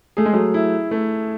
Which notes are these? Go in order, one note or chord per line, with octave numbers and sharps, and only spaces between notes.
A3 G#4
G#3
F#3 A3
E4
A3